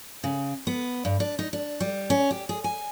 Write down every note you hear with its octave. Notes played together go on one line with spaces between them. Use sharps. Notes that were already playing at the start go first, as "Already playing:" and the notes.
C#3
B3
G2
D4
D#4
D4
G3
C#4
G4
G#4
G#5